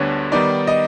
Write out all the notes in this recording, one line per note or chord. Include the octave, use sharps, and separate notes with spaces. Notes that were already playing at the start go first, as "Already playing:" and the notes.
Already playing: D2 D3 G3 B3 D4 C#5
D#3 G3 B3 D#4 D5
D#5